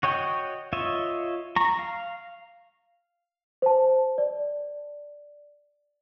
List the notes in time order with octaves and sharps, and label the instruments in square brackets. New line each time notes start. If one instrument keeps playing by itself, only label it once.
[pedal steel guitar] F#4 C#5 D#5 G5
F4 C#5 D#5 E5
A#5 C#6
F5
[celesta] C5 A5
D5